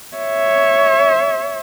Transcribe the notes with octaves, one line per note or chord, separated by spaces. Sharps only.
C#5 E5